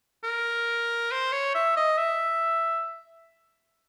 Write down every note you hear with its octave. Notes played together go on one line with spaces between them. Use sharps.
A#4
C5
C#5
E5
D#5
E5